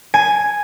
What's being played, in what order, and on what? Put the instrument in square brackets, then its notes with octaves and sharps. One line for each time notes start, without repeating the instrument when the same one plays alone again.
[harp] G#5